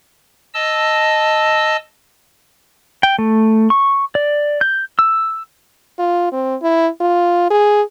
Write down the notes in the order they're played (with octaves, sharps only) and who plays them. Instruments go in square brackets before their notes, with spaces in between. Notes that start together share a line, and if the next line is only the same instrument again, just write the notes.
[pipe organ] D#5 A5 E6
[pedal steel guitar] G5
A3
C#6
D5
G6
E6
[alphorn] F4
C4
E4
F4
G#4